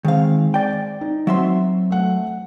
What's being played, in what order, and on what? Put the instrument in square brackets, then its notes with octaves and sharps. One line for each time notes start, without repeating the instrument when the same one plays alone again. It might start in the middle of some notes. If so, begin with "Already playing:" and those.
[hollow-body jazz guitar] D#3 F5 [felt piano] G#3 C4
[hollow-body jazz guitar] D5 G5
[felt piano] D#4
[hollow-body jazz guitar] F#3 E5 C6 [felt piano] C4 F#4
[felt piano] A3 F#5